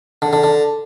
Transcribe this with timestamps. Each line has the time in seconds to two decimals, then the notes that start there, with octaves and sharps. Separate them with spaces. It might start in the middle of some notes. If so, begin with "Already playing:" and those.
0.22 D3
0.33 D3
0.44 D3